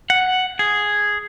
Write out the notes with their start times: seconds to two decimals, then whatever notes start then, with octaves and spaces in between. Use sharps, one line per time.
0.10 F#5
0.59 G#4